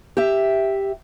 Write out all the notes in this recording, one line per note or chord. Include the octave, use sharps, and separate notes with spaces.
G4 E5